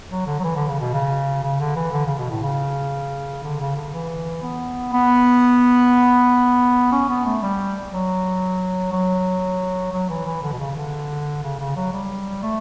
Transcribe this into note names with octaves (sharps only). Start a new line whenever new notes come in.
F#3
D3
F#3
E3
D3
C#3
B2
C#3
C#3
D3
E3
D3
C#3
B2
A2
C#3
D3
C#3
D3
E3
B3
B3
C#4
B3
A3
G3
F#3
F#3
F#3
E3
E3
D3
B2
C#3
D3
C#3
C#3
F#3
G3
A3